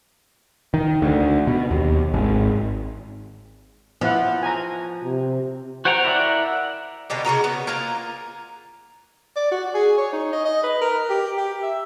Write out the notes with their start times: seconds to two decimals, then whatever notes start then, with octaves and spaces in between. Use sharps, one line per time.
0.74 D#3
1.02 D2
1.47 B2
1.71 D#2
2.14 G#1
4.01 F3 B3 E4 F#5
4.43 G#5 A#5
5.03 C3
5.85 F#4 C5 F#5 G5 A#5
6.05 E4 A#4 D5 F#5
7.10 B2 D3 D#4 G4
7.25 C#3 E3 F#4 A#4
7.44 B3
7.67 A#3 F4 G#5 A#5
9.36 D5
9.52 F#4
9.74 G#4
9.98 C#5
10.13 D#4
10.33 D#5
10.45 D#5
10.63 B4
10.81 A#4
11.10 G4
11.37 G4
11.62 E5